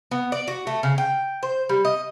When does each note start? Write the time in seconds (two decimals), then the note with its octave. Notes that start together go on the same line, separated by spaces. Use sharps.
0.11 B3
0.32 D5
0.48 F#4
0.67 A3
0.83 C#3
0.98 G5
1.43 C5
1.69 G3
1.85 D#5